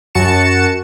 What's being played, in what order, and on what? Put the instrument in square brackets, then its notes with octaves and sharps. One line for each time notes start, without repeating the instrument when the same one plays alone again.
[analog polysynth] F#2 F#4 A5 C#7 E7